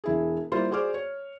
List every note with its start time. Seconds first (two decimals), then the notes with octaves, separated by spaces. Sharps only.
0.04 E1 E4 G#4
0.52 G3 A#3 E4 F4 C5
0.71 F#4 G#4 C5 D5 D6 F6
0.94 C#5